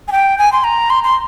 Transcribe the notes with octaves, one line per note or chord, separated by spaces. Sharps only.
G#5
G5
G#5
C6
A#5
C6
C6